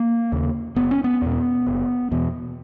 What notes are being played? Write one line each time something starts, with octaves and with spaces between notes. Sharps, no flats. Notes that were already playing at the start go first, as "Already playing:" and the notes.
Already playing: A#3
D#2 C#3
F#1 B3
C#4
B3
E2 B2
F#1
E2 B2